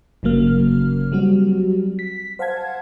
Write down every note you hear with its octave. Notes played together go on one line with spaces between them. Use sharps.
G1 C#3 F#3 A#3 F6
F#3 G3 C4 F#4
B6
C5 F5 F#5 A5 G#6